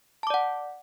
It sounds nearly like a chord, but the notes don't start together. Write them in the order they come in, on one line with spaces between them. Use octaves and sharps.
A5 D6 D5 F#5